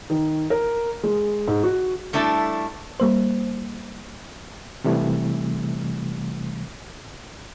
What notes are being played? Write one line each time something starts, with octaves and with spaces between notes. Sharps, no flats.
D#3
A#4
G#3
G#2
F#4
G3 A3 D4 E4 A4
G3 A#3 C5
C3 E3 G3 A3